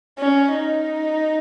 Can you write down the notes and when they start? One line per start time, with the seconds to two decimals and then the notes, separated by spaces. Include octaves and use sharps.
0.19 C#4
0.54 D#4